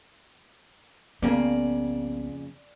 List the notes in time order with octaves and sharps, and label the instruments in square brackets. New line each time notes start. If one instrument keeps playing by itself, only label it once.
[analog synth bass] C2 [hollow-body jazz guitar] F2 C#3 A#3 [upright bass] B3 [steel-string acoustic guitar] D5